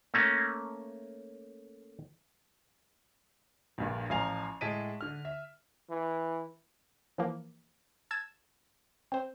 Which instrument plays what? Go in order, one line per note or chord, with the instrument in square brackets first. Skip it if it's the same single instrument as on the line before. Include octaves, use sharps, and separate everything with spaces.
[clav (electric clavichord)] A3 A#3 C#4
[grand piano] A#1 G2 A#2
A1 F3 F5 G#5 A#5 F7
A2 G#3 A5 B6 D7 D#7
D3 F6
E5
[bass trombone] E3
[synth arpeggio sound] E3 F3 A#3
A5 E6 G#6 A6 E7
C4 C5